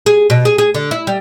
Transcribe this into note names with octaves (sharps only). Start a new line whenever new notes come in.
G#4
B2
G#4
G#4
D3
E4
G3